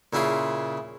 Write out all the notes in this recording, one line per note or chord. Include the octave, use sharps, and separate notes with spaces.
A#2 C#3 E4 F4 G#4